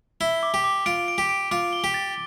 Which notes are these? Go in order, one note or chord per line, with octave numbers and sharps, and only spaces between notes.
E4 G7
D6
G4
D6
F4 D7
D7
G4
D7
F4 D6
G7
G4
A6